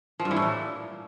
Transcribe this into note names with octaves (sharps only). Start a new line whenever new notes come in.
F3
G2
E3
A2
A#2